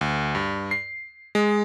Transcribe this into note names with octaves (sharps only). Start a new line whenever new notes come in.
D2
G2
C7
G#3